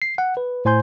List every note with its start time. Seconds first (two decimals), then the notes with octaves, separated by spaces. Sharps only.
0.02 C7
0.18 F#5
0.37 B4
0.65 A2 C5 G#5 C6 G6